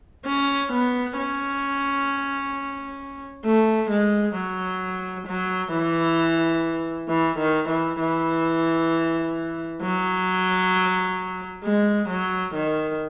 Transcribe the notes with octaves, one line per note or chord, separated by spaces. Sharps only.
C#4
B3
C#4
A3
G#3
F#3
F#3
E3
E3
D#3
E3
E3
F#3
G#3
F#3
D#3